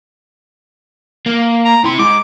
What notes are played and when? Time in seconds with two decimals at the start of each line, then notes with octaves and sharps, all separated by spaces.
1.26 A#3
1.65 A#5
1.84 C3 E4 C6
1.99 G#2 D6